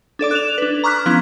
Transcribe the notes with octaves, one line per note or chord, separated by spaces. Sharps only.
D4 A4 D5 D6
F#6 E7 F7
D4 B4
A#5 C#6 D6 F6 F#6 B6
F3 B3 C#4 E4 G#6 B6